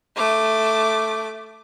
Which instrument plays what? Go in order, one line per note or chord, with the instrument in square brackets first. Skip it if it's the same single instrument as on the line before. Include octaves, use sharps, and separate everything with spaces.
[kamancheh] A3 D6